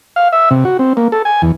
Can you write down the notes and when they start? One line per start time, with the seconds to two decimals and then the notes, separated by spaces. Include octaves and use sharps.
0.16 F5
0.32 E5
0.51 C3
0.65 F#4
0.79 C4
0.97 A#3
1.12 A4
1.25 G#5
1.42 E2